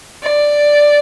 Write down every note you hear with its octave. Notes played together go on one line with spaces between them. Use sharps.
D5